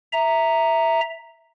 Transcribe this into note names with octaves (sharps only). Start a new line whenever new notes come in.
E5 A#5